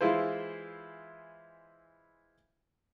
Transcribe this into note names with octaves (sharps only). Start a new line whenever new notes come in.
E3 G#3 E4 F4 C5